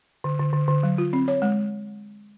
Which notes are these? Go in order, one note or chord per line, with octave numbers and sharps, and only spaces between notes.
D3
D3
D3
D3
F#3
F4
C4
C#5
G#3